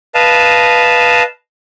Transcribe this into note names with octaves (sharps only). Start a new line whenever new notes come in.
B4 D#5 F5 A5